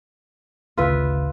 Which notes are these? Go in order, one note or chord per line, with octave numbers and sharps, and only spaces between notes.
G#1 D2 C#3 F4 B4 E5